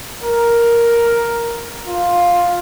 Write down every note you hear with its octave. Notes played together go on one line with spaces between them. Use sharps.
A#4
F4